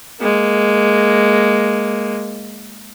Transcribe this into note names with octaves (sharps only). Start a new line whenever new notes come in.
G#3 A#3